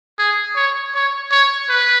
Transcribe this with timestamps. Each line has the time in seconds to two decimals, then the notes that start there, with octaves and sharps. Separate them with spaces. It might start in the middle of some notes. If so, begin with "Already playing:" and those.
0.19 G#4
0.56 C#5
0.95 C#5
1.31 C#5
1.69 B4